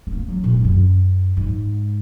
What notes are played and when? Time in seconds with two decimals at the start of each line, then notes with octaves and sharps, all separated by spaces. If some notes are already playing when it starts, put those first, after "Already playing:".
0.07 C4
0.12 A#3
0.28 F#3
0.44 A#2
0.54 G#2
0.64 F#2
1.37 G#2